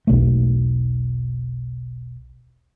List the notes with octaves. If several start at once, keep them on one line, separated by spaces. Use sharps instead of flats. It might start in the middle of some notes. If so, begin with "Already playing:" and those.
E1 B1 A3